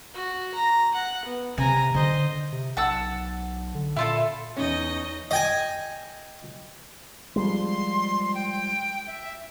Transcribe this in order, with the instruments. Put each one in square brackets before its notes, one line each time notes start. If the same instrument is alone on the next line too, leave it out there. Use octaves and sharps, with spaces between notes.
[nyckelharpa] F#4
A#5
F#5
B3
[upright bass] C3 [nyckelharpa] G#5 A#5
[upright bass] D3 [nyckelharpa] C5 D#5
[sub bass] C3
[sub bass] B1 [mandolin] F#5 A5 E6
[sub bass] D3
[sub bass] A#2 [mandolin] E4 F4 A4
[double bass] E2 [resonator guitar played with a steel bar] C#4 [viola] D#4 D#5
[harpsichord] D#5 G5 G#5
[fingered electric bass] F3 G3 G#3 [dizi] C6
[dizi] G5
E5